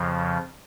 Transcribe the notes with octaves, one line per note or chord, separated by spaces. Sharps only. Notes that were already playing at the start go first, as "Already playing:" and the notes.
Already playing: F2 C#3 F3